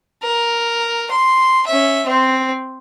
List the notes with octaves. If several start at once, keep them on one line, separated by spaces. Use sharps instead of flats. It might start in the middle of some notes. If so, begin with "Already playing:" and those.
A#4
C6
C#4 E5
C4 C5